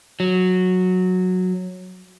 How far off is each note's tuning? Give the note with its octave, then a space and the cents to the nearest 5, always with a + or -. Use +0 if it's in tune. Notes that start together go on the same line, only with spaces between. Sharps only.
F#3 -10